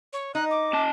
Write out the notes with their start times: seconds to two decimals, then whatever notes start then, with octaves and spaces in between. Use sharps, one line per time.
0.13 C#5
0.35 D#4 D#5 F#6
0.51 D6
0.73 C#4 A5